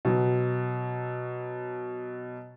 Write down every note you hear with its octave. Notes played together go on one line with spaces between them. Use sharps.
B2 F#3